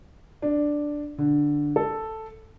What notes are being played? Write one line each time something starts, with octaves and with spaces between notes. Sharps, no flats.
D4
D3
A4